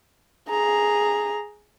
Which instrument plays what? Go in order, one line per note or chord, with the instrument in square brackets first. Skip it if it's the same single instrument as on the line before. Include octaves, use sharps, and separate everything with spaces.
[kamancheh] G#4 A#5